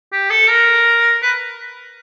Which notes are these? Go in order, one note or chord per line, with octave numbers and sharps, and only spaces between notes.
G4
A4
A#4
B4